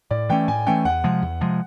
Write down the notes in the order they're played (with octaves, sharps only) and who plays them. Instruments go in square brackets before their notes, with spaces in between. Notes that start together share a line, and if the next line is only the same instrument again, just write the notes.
[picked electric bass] A2 [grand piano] D5
[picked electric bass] E3 A3 C#4 [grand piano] G5
[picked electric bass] A2 [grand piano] G#5
[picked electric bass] E3 A3 C#4 [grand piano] G5
[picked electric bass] E2 [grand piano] F#5
[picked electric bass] C3 F3 G#3
E2
C3 F3 G#3